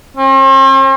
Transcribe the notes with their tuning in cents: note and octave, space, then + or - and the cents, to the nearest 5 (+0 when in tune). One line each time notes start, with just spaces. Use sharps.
C4 +45